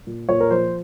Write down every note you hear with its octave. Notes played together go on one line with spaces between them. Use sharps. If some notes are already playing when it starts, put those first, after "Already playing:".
A#2
A#2 C#5
A#4
F3 C5